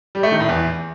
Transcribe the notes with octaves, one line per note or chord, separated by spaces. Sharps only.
G3
A3
D#3
A2
E2